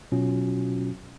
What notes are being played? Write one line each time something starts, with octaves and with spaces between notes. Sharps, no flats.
B2 F#3 C#4 F4 F#4